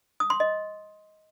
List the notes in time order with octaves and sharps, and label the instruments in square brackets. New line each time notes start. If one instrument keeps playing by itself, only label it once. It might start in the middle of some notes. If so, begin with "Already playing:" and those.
[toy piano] D#6
C6
D#5